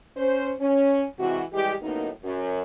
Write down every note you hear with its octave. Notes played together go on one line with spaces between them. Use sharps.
C#4 C5
C#4
C3 E3 G#3 F#4
E3 G3 G#3 G4
F#2 A2 A#3 B3 D#4
F#2